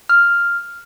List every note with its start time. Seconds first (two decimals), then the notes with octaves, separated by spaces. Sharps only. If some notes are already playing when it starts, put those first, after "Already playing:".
0.09 F6